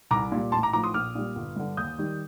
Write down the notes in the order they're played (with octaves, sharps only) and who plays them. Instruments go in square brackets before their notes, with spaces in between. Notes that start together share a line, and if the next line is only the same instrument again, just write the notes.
[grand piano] C2 A#5 D6
A#2 G3
A1 A5 C6
A#5 D6
A2 F3 A#5 D6
C6 D#6
A#1 D6 F6
A#2 G3
G1
G2 D3
D#2 D#6 G6
D#3 G3